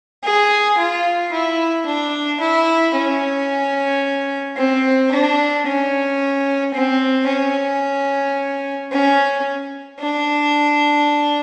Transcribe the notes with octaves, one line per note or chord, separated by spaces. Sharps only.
G#4
F4
E4
D4
E4
C#4
C4
D4
C#4
C4
C#4
C#4
D4